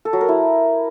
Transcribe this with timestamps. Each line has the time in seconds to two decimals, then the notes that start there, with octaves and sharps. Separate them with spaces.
0.05 A4
0.13 F#3
0.21 A#4
0.29 E4